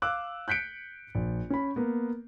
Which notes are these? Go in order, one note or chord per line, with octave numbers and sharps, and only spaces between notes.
F5 D6 E6 F#6
F#6 G6 B6 C#7 D7
A#1
C#4 B5
A#3 B3